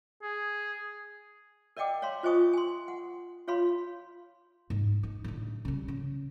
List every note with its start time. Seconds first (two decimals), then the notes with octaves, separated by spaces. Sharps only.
0.22 G#4
1.77 A#4 D5 D#5 F#5 G5 D6
2.02 C#5 F5 A#5 C6
2.23 F4 C5 D#5 G#5 C#6 D#6
2.53 G#5 C6
2.88 F#5
3.48 F4 C#5 F5 B5 C6
4.70 G#2
5.03 D#4
5.24 A1 D3
5.65 C#3 G3
5.88 C#3